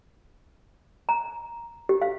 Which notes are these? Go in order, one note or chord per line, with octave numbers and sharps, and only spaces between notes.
A#5
G4
F5